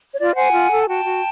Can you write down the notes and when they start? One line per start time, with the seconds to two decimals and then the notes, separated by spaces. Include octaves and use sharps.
0.14 C#5
0.19 F4 D5
0.36 C5 F#5 G#5
0.53 F4
0.70 A4
0.83 G#5
0.87 F#4 G5 A5
1.05 F#4